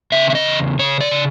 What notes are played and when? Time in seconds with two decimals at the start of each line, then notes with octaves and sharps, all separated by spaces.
0.12 C#3 E5
0.30 E5
0.35 D#5
0.46 E2
0.79 C#3 C#5
1.01 D5
1.11 C#3